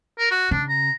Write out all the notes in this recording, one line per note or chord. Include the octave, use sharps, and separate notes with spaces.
A#4
F#4
C#3 D4
A#5